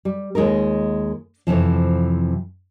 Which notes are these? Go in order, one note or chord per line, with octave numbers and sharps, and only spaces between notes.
G3
D#2 G#3 D#4 F4 A#4
F2 C3 E3 F3